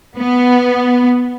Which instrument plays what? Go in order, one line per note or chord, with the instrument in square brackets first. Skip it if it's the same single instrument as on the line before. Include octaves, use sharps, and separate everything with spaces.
[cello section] B3